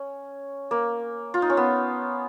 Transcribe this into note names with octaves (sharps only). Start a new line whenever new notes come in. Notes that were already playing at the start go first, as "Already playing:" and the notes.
Already playing: C#4
A#3
F4
D#4
C#4
B3